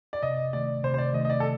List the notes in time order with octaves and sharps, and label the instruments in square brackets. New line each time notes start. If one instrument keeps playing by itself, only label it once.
[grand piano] D5
[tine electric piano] C3 [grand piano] D#5
[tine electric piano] D#3 A3 [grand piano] D5
[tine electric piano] C3 [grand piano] C5
[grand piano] C5
D5
[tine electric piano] D#3 A3 [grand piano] D#5
[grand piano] D#5
D5
A4